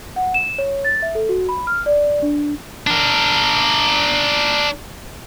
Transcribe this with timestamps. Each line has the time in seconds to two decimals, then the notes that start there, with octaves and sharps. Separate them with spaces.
0.16 F#5
0.34 E7
0.58 C#5
0.85 A6
1.02 E5
1.15 A4
1.29 F#4
1.49 B5
1.67 F6
1.86 D5
2.22 D4
2.87 D4 A#4